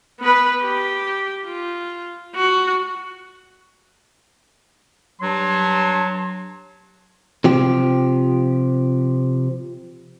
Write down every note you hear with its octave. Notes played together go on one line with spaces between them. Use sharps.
B3 B4
G4
F4
F#4
G2 F#3 A5 C6
C3 F3 G4